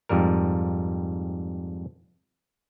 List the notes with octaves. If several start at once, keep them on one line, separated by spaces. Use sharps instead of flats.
F2 G#2 G3 A#4